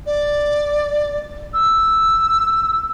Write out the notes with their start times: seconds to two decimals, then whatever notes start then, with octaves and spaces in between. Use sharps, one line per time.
0.06 D5
1.53 E6